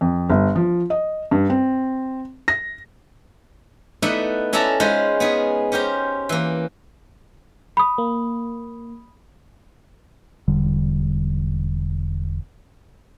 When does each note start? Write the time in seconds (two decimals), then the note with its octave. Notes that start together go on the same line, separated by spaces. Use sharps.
0.01 F2
0.30 G1
0.55 F3
0.90 D#5
1.31 G2
1.50 C4
2.48 A#6
4.02 A3 B3 D#4 E4 D5 F#5
4.53 C#4 E4 A4 D5 A5 A#5
4.80 G#3 C#4 D#4 F4 B4 C5
5.20 B3 D#4 G#4
5.72 C#4 G4 A#4 C5
6.29 E3 A#3
7.77 B5 D#6
7.98 A#3
10.48 E1 D3 G3